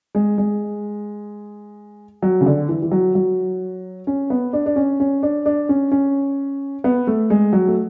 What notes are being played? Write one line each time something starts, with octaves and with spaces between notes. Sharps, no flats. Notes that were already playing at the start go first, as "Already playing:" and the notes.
G#3
G#3
F#3
C#3
D3
E3
E3
F#3
F#3
C#4
B3
D4
D4
C#4
C#4
D4
D4
C#4
C#4
B3
A3
G#3
F#3
A3